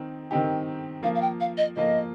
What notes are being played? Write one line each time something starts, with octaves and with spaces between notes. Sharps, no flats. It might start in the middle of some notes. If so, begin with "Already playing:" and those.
Already playing: D#3 C4 D#4
D#3 C4 D#4 G4
F3 A#3 F4 F5
F5
G5
F5
D#5
F3 A#3 F4 D#5